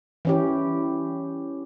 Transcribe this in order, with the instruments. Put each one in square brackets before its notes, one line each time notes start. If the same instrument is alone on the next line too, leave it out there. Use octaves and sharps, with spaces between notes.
[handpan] E3 C#4 G4